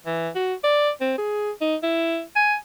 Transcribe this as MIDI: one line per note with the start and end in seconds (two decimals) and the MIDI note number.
0.06 0.29 52
0.35 0.54 66
0.64 0.90 74
1.01 1.14 60
1.18 1.51 68
1.61 1.76 63
1.83 2.21 64
2.36 2.55 80